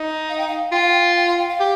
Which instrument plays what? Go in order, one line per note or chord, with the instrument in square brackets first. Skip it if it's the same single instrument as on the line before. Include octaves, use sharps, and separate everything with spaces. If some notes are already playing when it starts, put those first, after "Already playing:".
Already playing: [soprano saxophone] D#4
[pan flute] F5
G5
F5
[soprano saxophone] F4 [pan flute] G5
[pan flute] F5
G5
G5
F5
G5
F5
[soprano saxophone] G4